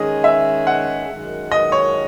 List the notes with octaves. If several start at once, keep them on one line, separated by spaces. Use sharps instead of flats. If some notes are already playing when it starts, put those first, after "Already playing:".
Already playing: D#3 G#3 C#4 G#4 D#5
E5
F#5
F#2 D#3 G#3
D#5
C#5